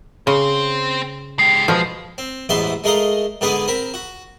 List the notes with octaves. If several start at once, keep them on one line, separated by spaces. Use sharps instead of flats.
C#3 C4 C5
G#3 G4 C7
B2 F3 G#3
C4
A1 E2 G#2 B3 E5 C6
G#3 A3 G#4 A#4 D#5 F5
G#2 D3 B3 G#4 B4 G#5
C4 A#4 B5
F#4